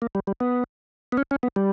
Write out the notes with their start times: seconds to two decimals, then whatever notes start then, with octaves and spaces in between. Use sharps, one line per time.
0.02 A#3
0.15 G3
0.27 G3
0.40 B3
1.12 B3
1.17 C#4
1.31 C#4
1.43 B3
1.56 G3